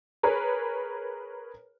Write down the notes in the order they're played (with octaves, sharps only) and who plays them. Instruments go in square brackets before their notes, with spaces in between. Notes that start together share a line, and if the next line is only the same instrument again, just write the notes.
[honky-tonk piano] G#4 A#4 B4 C#5